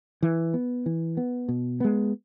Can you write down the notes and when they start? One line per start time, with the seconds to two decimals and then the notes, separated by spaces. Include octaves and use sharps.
0.23 E3
0.54 B3
0.86 E3
1.17 B3
1.48 B2
1.80 G#3 B3